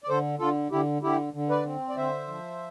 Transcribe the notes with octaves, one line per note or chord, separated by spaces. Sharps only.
D5
D3 A4 C5
D3 F4 A4
D3 E4 G4
D3 E4 G4
D3
B4 D5
C4
D5
D3 C5 E5
F3